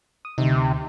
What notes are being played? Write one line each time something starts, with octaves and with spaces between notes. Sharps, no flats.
D#6
D2 C3 D#4